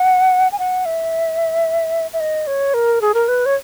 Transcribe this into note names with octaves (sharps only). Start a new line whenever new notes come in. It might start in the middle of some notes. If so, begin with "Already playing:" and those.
Already playing: F#5
G#5
F#5
E5
E5
D#5
C#5
A#4
G#4
A#4
B4
C#5